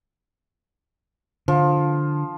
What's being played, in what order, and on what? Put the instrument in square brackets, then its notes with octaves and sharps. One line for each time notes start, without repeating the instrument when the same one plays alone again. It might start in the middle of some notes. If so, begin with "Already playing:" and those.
[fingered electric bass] D3 [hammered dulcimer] F3